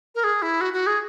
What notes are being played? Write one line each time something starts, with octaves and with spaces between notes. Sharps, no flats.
A#4
G#4
E4
F#4
F#4
G#4